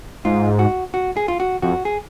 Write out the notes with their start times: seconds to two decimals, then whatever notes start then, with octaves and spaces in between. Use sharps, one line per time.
0.25 G#2 F4
0.59 F#4
0.94 F#4
1.17 G#4
1.28 F4
1.40 F#4
1.62 F2 F#4
1.85 G#4